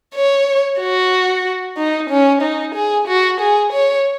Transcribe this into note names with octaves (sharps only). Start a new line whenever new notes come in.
C#5
F#4
D#4
C#4
D#4
G#4
F#4
G#4
C#5